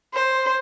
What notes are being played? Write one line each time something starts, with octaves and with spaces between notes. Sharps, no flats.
C5